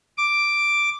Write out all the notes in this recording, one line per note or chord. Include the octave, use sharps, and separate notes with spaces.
D6